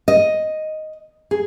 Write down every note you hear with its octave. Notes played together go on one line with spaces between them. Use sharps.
D#5
G#4